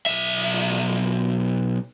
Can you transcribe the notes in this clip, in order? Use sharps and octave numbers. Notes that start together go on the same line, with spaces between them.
B1 E5